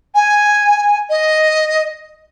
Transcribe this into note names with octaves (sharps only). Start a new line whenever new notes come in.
G#5
D#5